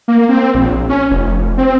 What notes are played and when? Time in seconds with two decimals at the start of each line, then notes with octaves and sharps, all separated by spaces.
0.08 A#3
0.29 C4
0.54 A#1
0.89 C#4
1.11 F1
1.58 C4